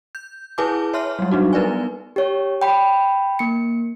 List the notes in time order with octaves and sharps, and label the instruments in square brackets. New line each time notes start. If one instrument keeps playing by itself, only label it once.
[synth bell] G6
E4 G#4 B4 G#5 A5 D6
C#5 E5 C6 F6
F#3 G3
F#3 G3 D4 D#4 F#4
B3 A#4 B4 D5 G#5
[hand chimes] G4 C#5
G5 B5
A#3 C#7